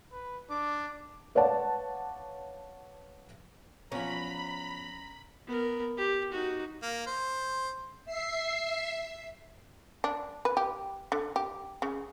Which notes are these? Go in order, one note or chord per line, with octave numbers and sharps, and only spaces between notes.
B4
D4 D6
B4 C#5 D5 F5 F#5 A5
E2 F3 C#4 A#5 B5
B3 A#4
G4
D#4 F#4
A#3
C5
E5 C7
D4
B4
G4
D3
G4
C#3